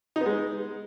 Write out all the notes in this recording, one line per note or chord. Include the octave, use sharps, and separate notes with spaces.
D#4
B3
G#3